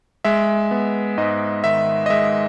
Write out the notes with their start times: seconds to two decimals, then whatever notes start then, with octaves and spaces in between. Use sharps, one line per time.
0.24 G#3 E5
0.71 B3
1.18 G#2 D#5
1.64 D#3 E5
2.06 D#5
2.10 G#3 E5